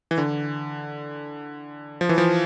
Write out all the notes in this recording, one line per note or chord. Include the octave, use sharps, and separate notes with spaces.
E3
D3
F3
E3
F3